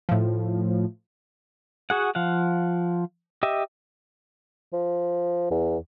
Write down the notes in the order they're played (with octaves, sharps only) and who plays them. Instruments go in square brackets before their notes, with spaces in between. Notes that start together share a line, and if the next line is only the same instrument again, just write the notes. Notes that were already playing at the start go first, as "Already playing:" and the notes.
[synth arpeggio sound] A2 F3
[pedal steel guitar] F#4 G#4 F#5
F3 F5 F#5
G4 D#5 E5
[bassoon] F3
E2